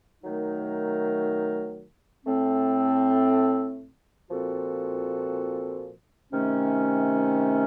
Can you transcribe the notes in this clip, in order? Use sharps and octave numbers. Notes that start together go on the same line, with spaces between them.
D#3 F#3 A3 D#4 A#4
A2 A3 C4
A#2 F3 C4 F#4 A4
C3 D#3 A3 C#4